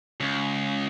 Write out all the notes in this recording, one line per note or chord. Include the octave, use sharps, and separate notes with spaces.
C#2